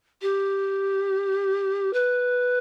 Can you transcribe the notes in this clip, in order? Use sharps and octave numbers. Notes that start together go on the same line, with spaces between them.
G4
B4